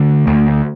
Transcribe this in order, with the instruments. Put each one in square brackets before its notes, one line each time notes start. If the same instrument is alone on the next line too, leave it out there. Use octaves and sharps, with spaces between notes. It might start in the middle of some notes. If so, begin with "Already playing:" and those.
Already playing: [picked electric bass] D3 A3
D2